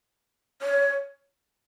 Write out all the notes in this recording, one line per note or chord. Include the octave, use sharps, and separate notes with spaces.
C#5